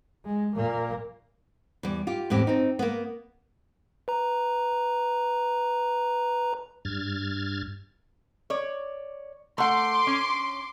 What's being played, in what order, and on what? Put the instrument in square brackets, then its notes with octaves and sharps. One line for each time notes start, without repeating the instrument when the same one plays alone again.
[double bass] G#3
A#2 A#3
[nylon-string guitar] E2 G3
F4 G4
E2 A2 C4 G4
C4 D#4
A#3 B3
[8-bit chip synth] B4 A#5
[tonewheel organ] G2 F6 G#6 A6
[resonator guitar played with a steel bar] C#5 D5
[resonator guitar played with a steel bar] A3 F#5 [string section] C6 D6
[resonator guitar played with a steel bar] C#4